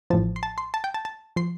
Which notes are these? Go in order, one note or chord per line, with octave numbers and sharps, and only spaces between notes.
A1 A2 F3 A5
C6
A5
C6
A5
G5
A5
A5
F3 C6